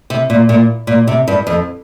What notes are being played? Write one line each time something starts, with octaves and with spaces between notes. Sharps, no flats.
C3
A#2
A#2
A#2
C3
G2
F2